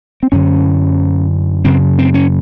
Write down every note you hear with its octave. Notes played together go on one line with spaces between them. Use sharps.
C4
F#2 D3 C#4
F#2 C#3 C4
C4
C#4